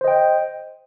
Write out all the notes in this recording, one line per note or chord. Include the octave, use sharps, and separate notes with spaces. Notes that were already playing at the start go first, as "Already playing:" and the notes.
C5 D#5 G5